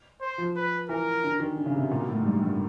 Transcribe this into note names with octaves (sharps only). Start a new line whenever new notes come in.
C5
F3
B4
E3 A#4
D3
D#3
D3
C#3
C3
B2
A#2
B2
A2
G#2
G2
G#2
G2